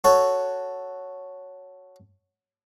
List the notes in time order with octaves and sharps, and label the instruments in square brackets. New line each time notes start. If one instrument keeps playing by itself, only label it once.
[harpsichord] F#4 A4 C#5